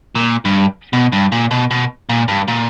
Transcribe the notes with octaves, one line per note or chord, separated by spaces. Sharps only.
A#2
G2
B2
G2
A#2
B2
B2
A#2
G2
A#2